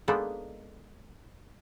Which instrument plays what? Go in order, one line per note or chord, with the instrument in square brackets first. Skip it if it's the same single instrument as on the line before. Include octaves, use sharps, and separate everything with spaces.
[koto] G#3 A#3 B3 D4 D#4 A4